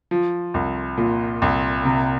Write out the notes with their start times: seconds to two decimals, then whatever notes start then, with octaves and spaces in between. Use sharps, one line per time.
0.11 F3
0.54 C2
0.98 A#2
1.42 C2
1.85 C3